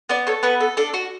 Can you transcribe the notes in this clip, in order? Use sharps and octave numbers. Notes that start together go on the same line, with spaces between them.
B3 D5
A4 C#5
B3 B4
A4
D4 A4
F#4